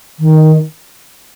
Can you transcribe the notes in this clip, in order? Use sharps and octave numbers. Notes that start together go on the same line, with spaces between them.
D#3